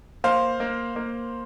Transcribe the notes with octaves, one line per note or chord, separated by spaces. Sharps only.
A#3 C5 F5
A#3
A#3